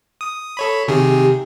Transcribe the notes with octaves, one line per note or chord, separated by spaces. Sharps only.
D#6
A4 C#5 B5
C3 D#3 G4 G#4